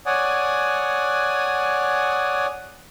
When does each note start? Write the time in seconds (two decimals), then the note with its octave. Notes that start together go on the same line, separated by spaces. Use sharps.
0.06 C#5 D5 F#5 G#5 D#6